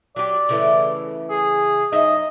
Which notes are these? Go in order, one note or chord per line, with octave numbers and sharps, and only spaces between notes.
F#3 G4 D5
C#3 E3 A3
G#4
F#2 D#4 D#5 E5